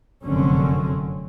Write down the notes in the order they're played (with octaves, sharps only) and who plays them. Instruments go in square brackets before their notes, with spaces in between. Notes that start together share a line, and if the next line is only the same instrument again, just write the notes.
[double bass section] F1 F#2 D3 C4 C#4